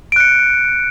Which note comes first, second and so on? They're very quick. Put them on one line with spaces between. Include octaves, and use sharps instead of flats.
D7 F#6 C#7